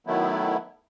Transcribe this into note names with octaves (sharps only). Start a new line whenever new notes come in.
D#3 F#3 A3 B3 E4